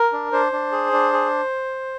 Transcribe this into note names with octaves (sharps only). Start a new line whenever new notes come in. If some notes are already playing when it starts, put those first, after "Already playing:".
Already playing: A#4
D4
D4 C5
D4
G#4
D4
G#4